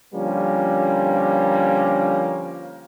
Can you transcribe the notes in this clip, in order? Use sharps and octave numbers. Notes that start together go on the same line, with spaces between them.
D3 F3 G3 A#3 C#4